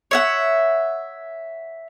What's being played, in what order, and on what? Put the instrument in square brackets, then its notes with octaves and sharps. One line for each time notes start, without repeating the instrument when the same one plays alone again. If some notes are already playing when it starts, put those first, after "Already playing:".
[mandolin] C#5 E5 F#5